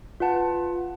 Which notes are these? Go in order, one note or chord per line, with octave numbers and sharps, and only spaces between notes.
F4 B4 F#5 A5